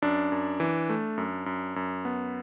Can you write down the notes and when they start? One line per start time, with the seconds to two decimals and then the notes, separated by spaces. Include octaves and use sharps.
0.02 F#2 D4
0.32 F#2
0.60 E3
0.89 A3
1.18 F#2
1.46 F#2
1.76 F#2
2.05 B3